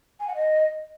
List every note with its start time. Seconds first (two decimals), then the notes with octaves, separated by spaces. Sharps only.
0.20 G#5
0.27 F#5
0.35 D#5